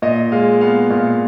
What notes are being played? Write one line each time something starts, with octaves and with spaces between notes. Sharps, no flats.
A#2 D#5
G#3 F5
B3 F5
A#2 F5